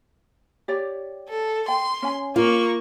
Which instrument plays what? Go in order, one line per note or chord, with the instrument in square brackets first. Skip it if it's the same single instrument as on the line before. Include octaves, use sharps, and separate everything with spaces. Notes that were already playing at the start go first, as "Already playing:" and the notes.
[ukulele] G4 C#5 D5
[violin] A4
[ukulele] G5 [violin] C6
[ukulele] C#4 G#5
[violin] A#3 C#6 [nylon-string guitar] F4